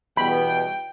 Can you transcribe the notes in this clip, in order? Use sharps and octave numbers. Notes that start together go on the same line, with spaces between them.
E2 B2 G3 B3 G5 B5